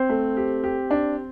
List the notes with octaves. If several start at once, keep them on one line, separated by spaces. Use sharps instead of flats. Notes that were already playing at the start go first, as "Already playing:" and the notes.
Already playing: C4 C5
A3
G4
G4
D4